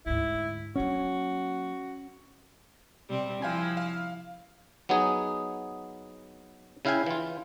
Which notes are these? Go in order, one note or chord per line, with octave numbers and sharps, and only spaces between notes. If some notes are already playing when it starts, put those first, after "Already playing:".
D2 G#2 E4
F#3 A#3 C#4 F#4
C3 G3 C4
F3 E4 F5 G5 G#5
F5
F#3 B3 D#4 G#4
C#3 E4 F5 G5 G#5
E3 F4